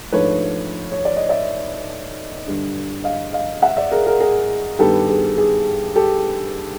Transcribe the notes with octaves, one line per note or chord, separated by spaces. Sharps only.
G#2 F3 A3 D4 B4 C#5
C#5
D5
D#5
D5 E5
G2 D3 G3
D#5 F5
D#5 F5
E5 F#5
D5 E5
G#4 A#4
G#4 A#4
G#4 A#4
G2 D#3 G3 B3 G4 A4
G#4
G#4
G4 A4